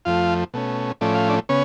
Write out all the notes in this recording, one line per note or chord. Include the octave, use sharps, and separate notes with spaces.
F2 F3 A3 F4 F5
B2 A3 C#4
A2 F3 A3 C#4 D5
F5
D4 D5
C#3 B3 C#4 C#5